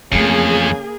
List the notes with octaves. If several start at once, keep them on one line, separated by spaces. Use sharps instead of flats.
F2 C#3 E3 A3 A#3 G#4